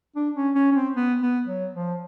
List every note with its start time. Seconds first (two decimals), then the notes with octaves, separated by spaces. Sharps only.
0.16 D4
0.36 C#4
0.55 C#4
0.71 C#4
0.75 C4
0.96 B3
1.22 B3
1.48 F#3
1.75 F3